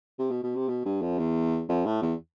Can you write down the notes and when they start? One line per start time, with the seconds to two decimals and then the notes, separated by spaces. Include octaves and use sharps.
0.19 C3
0.31 B2
0.43 B2
0.56 C3
0.68 B2
0.85 G2
1.02 F2
1.18 E2
1.69 F2
1.86 A2
2.02 E2